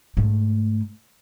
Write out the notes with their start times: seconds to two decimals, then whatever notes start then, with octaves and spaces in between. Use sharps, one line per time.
0.17 G#2 A3